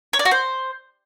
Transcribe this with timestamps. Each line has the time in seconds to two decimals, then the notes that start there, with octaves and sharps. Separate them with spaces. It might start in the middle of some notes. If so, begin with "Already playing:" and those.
0.13 C#5
0.19 D5
0.25 F#4
0.31 C5